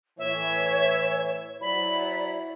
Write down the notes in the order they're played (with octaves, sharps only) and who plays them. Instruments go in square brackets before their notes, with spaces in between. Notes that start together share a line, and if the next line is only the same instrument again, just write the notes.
[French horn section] A2 E3 [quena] C#5 [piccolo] E5
[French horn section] F#3 E4 C5 [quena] D5 [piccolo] B5